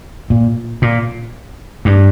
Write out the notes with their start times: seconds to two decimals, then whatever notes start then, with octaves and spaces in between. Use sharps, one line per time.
0.30 A#2
0.82 A#2
1.85 G2